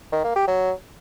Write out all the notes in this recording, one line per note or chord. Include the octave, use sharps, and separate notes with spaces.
D#3
A#3
G4
F#3